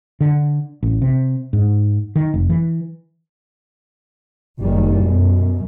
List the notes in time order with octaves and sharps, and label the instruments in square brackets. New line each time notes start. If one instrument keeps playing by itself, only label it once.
[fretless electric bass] D3
A1
C3
G#2
D#3
F1
E3
[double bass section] F#1 D#3 G3
F#2 B2